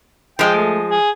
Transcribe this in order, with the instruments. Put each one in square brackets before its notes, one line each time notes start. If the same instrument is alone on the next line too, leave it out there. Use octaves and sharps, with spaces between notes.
[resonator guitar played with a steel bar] F3 G#3 [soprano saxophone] G5
[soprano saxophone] A3
G#4